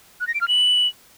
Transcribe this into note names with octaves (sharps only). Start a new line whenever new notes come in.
F#6
A#6
D7
F6
F#7